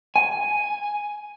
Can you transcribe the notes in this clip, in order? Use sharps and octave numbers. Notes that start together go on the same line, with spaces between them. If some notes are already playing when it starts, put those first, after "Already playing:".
G#5